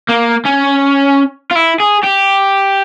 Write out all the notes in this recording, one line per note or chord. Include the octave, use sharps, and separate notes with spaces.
A#3
C#4
F4
E4
G#4
G4